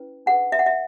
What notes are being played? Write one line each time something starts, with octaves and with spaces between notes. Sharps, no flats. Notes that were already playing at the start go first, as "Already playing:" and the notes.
Already playing: C#4 E4 B4
D4 G#4 B4 F#5
E5
F#5
E5